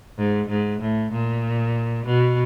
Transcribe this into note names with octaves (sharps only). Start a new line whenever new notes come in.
G#2
G#2
A2
A#2
B2